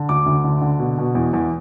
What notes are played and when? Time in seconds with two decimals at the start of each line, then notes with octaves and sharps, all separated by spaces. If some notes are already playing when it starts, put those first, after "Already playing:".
Already playing: D3
0.09 D2 D6
0.26 D2
0.44 D3
0.61 D3
0.79 B2
0.98 B2
1.15 E2
1.33 E2